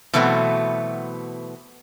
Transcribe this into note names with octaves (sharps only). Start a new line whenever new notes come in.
B2 E3 F#3 A3 B3 C4